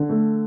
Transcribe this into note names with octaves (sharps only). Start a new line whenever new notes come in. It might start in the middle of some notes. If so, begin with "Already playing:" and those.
Already playing: D3
A3